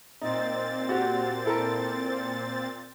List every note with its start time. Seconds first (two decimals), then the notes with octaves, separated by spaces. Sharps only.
0.21 A#2 C4 D#4 A6
0.89 F#4 G4
1.45 E4 A4 A#4